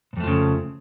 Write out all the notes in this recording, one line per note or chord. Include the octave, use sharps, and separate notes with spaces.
F2 G#2 C#3 F3 A3